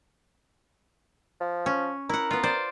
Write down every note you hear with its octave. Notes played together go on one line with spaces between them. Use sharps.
F3
C#4
E4 A#4 F#5
B3 F4
C5 D5